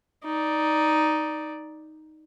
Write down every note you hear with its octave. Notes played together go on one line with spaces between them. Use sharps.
D#4 D5